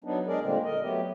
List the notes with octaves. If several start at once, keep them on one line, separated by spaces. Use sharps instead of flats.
F#3 B3 D4 D#4
G#3 D4 G#4 A#4 D5
A#2 D3 G3 G#3 A#3 C4
A#4 D#5
F#3 A3 B3 G4